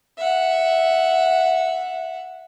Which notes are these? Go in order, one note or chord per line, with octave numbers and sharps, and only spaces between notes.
E5 F#5